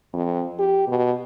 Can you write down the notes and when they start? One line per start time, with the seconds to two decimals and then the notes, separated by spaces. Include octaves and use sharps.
0.13 F2
0.59 G4
0.88 B2